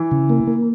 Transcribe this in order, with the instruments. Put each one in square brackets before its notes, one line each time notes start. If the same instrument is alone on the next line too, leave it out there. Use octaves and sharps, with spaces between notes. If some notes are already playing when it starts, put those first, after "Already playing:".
Already playing: [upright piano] E3
[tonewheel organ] C#3
A#3
A#3